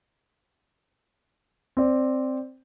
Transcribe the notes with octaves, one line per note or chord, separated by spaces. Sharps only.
C4 D5